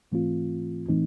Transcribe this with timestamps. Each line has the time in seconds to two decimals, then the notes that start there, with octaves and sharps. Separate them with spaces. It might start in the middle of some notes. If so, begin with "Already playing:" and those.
0.12 G#2 E3 A3 C4 F4
0.89 A2 E3 A3 C4 D#4